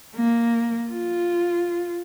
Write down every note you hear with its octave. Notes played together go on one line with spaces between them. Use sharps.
A#3
F4